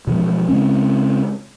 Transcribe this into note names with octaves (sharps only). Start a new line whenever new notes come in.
B2 E3 F3 G#3
C#3 G#3 C4 C#4